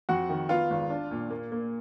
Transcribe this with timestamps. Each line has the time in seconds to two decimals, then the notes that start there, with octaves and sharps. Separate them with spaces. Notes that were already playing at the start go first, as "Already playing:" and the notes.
0.09 F2 F#4 F#5
0.29 D#3
0.49 B3 F4 F5
0.70 G#1
0.90 D4
1.11 A#2
1.31 A#3
1.52 A#3